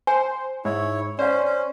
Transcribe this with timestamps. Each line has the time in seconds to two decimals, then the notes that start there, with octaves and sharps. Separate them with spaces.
0.07 C5 G#5
0.65 G#2 E4 C#5
1.19 C#4 C5 D5 F5
1.44 C#4